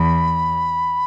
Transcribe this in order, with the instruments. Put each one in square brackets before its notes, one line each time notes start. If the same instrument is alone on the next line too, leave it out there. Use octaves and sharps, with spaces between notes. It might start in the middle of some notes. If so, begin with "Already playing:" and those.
Already playing: [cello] E2 [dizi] B5